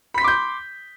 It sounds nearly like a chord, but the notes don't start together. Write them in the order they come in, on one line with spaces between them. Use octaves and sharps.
B5 B6 C6 D6 G6